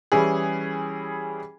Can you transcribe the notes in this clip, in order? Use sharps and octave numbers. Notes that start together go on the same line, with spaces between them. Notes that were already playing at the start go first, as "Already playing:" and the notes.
E3 G3 C#4 E4 G#4